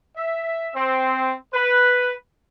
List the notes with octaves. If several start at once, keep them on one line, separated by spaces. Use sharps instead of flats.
E5
C4
B4